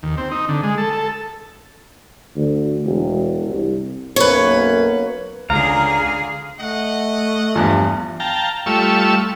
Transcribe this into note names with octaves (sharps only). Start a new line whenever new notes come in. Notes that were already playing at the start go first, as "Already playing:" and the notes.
D#2
C4
D#4
D3
G#3
A4
A4
D2
E1
C2
B1 F#2 A#3 B4 C#5
C#2 D3 G#4 F5 A#5
A3 D#5 F#5
E2 G2 F3
F5 G5 A5 A#5
G3 A3 F4 C#6 E6